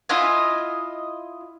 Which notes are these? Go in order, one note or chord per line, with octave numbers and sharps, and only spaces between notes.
E4 F4 D#5 G#5